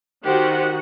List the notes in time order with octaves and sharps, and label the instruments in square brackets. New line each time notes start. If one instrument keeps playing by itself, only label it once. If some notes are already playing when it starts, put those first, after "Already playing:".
[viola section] D#3 F#4 F#5 [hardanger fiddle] G4 C5